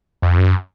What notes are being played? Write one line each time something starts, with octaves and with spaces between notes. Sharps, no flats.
F2
F#2